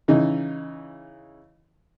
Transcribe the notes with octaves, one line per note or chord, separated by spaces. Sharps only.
C#3 E3 D#4